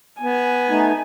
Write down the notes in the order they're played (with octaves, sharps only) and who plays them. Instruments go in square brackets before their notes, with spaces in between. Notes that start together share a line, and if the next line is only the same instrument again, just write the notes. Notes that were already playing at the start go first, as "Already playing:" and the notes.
[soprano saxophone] B3 [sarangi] G#5
[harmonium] A3 D#4